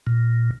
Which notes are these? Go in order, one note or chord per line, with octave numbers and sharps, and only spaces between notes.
A#2